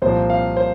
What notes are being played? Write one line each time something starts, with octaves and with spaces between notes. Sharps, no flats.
C2 A#2 F3 C5
F5
C5